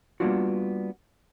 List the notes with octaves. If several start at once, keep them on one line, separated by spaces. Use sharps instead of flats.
G3 A#3 B3 D4 F4 F#4